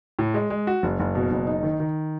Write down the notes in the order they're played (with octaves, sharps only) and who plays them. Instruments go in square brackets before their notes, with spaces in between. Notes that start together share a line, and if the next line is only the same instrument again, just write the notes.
[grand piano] A2
G#3
G#3
F#4
F#1
F#1
B2
F#1
D#4
D#3
D#3